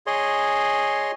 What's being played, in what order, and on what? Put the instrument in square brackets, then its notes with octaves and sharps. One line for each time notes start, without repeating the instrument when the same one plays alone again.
[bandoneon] G#4 C#5 D#5 C6